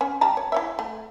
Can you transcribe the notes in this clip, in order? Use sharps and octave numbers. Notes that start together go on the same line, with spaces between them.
C#4 C#5
G3 A5 A#5
C#5
E4 C#5 E5
A3